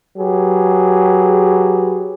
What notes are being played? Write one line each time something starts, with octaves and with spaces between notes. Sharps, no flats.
F#3 G4 G#4 B4